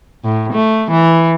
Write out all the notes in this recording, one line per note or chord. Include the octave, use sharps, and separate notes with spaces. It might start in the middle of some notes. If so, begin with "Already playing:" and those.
A2
A3
E3